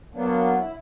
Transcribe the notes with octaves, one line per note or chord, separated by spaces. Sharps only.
F#3 A#3 B3 D4
E4